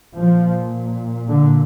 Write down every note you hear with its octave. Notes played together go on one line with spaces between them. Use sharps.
A#2 F3
D3